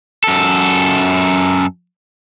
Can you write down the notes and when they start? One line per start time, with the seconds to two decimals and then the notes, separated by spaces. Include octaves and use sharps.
0.24 F#2 A4